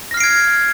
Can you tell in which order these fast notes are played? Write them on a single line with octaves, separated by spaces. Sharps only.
A#6 F6 C7 D7 G#6